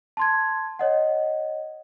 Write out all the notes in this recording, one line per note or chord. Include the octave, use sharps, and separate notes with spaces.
A5 C6 G#6
C#5 D#5 F#5